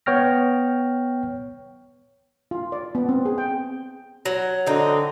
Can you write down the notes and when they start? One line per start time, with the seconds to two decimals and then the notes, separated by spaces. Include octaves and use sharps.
0.06 B3 C#5 G5 F6 A#6
2.51 F4
2.72 D5
2.95 B3
3.09 C4
3.25 G#4
3.38 G5
4.25 F#3
4.67 D3 C4 D#4